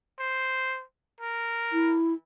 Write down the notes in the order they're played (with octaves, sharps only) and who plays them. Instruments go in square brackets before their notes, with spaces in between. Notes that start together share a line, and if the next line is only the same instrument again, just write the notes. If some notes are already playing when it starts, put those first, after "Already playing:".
[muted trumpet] C5
A#4
[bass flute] E4